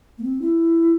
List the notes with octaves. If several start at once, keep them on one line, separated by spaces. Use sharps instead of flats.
A#3
C4
E4